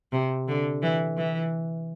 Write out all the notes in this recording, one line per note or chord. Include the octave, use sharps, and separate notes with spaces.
C3
D3
E3
E3